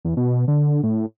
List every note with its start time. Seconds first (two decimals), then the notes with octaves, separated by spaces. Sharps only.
0.05 E2
0.17 B2
0.48 D3
0.83 A2